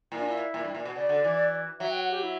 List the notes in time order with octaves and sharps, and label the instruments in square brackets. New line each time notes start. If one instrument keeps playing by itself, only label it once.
[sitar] A#2 [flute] E4
[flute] D4
E4
[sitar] A#2
G2
A#2
B2
[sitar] C#3 [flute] D5
[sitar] D3
E3
[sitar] F#3 [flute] E5
[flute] G5
F#5
G4
E4